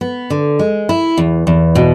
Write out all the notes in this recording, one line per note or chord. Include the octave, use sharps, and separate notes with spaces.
B3
D3
G#3
E4
E2
E2
B2